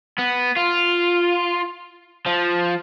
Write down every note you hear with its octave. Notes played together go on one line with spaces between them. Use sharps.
B3
F4
F3